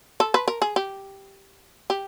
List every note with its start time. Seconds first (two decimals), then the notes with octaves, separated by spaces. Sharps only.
0.20 A4
0.34 B4
0.48 A#4
0.62 G#4
0.76 G4
1.90 G4